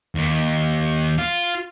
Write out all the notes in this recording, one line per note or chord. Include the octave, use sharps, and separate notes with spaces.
D#2
F4